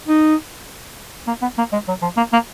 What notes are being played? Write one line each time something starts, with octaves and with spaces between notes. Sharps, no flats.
D#4
A#3
B3
A#3
G#3
F#3
F3
A#3
A#3